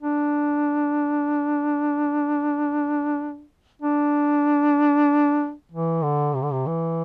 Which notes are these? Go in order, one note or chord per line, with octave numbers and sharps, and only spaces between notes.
D4
D4
E3
D3
C3
D3
C3
E3